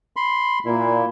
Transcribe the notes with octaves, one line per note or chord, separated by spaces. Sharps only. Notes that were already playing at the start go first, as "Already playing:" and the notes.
B5 C6
A#2 E4